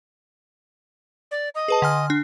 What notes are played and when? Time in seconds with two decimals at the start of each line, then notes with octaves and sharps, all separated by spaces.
1.31 D5
1.55 D#5
1.68 G#4 B4 A5
1.82 D3 G#5 F6
2.10 D4